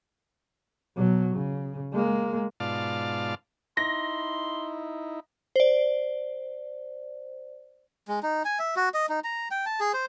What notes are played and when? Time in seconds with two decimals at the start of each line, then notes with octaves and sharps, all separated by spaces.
0.96 B2 F#3
1.35 C#3
1.93 G#3 A#3
2.60 G#2 B2 F4 D5 F5 A5
3.77 D#4 E4 C6 A#6
5.56 C5 D5
8.08 G#3
8.23 D#4
8.45 G#5
8.59 E5
8.76 F#4
8.94 D#5
9.09 D#4
9.24 A#5
9.51 G5
9.66 A5
9.80 G#4
9.94 C5